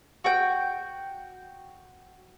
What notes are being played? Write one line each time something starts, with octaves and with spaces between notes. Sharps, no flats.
F#4 G5